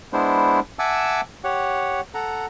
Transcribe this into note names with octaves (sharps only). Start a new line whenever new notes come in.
G#3 B3 D4 E4 C5
E5 F#5 G#5 A5 D6 E6
G4 C#5 F#5
A4 F#5 A#5